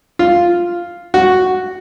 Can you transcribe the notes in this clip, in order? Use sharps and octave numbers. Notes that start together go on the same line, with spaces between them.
F4
F#4